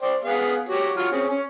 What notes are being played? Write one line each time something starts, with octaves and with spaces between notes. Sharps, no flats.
C5 D5 G5
B3 G#4 F5
F#4 G4 C#5
F#3 F4 C#5
C4 C#4 G#4
C#4 C#5